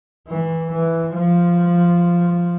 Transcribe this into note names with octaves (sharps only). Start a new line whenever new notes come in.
E3
E3
F3